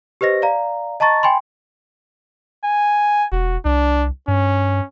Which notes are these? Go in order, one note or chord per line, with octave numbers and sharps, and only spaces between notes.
G4 B4 C5 D#5 A#6
D5 F5 A#5
D#5 A5 A#5 C#6 A6
G5 G#5 B5 C6
G#5
E1 F#4
C2 D4
G2 C#4